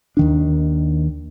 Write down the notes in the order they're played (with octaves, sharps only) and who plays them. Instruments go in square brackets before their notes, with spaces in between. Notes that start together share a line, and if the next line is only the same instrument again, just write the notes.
[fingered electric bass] D#2 D#3 D4